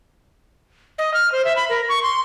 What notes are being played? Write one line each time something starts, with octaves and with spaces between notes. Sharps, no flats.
D#5
F6
C5
E5
B5
A#4
C#6
C6